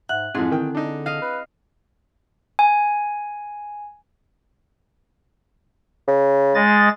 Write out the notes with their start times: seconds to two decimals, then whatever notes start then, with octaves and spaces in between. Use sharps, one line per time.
0.09 G#2 E5 F#5 F#6
0.35 F2 G#2 F3 C4 E4 G#4
0.51 D3 D#3 G5
0.75 D4 D#4
1.06 D#5 F5
1.22 B4
2.59 G#5
6.08 C#3
6.55 G#3 D#5 A6